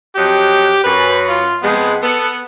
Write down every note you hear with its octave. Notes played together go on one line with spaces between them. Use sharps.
F2 F#3 G4 D#5
F#2 B4
F4
F2 G#3 B3
B3 A4